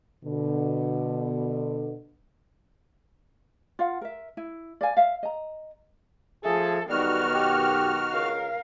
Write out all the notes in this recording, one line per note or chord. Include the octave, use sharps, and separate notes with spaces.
B2 D3
F4 F5 F#5
A#4 E5
E4
D5 F5 G#5
E5 F5
D#5 A#5
F3 A3 G#4 A4
B1 D#3 G3 B3 F#4 F6
G4
C#2 A#4 F5